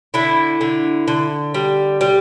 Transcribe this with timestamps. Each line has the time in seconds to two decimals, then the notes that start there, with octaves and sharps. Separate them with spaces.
0.14 D3 E4
0.61 D3
1.08 D3
1.54 G3
2.01 G3